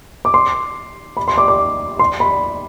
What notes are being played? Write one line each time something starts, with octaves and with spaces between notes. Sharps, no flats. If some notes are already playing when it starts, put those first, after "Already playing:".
D6
C6
B5
C6
D6
D6
C6
B5